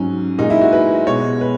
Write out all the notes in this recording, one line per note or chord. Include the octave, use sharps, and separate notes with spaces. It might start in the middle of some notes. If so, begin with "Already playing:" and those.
Already playing: G#2 F#3 C#4
A#2 G#3 D#4
E4
F#4
B4
B2 G#3 C#5
B4